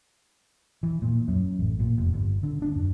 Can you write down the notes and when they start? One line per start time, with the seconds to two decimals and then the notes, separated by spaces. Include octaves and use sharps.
0.83 E3
1.02 A#2
1.28 F#2
1.59 A1
1.79 A#2
1.98 F1
2.13 G1
2.43 D3
2.62 D4
2.76 F#2